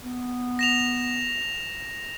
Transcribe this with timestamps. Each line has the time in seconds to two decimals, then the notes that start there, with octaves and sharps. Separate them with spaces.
0.02 B3
0.59 A#6 E7 F7